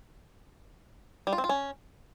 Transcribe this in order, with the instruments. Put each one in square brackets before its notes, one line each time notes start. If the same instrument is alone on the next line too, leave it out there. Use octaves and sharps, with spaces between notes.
[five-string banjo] G3
F4
C4
F4
C#4